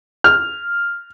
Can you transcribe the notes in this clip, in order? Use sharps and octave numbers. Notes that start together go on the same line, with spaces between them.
F6